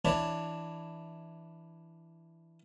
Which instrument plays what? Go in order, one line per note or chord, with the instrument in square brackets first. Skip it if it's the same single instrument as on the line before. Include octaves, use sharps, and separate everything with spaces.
[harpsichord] E3 D4 C#5